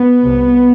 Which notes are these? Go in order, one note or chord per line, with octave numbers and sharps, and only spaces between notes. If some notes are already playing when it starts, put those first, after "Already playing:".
Already playing: B3
C2 C3